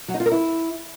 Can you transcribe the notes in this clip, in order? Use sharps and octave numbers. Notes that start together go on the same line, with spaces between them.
F#3
D#4
F4
A#4
E4